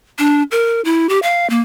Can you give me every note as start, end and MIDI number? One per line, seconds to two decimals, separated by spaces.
0.19 0.43 62
0.51 0.81 70
0.85 1.09 64
1.09 1.19 67
1.23 1.49 77
1.50 1.60 58